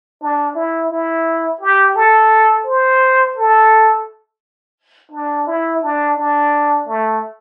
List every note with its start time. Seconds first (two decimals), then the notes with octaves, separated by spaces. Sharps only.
0.21 D4
0.55 E4
0.90 E4
1.61 G4
1.95 A4
2.66 C5
3.37 A4
5.11 D4
5.47 E4
5.82 D4
6.17 D4
6.87 A3